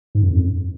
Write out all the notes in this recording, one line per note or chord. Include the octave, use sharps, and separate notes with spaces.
G#2
F#2
F2